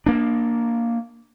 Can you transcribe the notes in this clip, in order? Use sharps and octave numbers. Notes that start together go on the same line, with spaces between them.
A#3 D4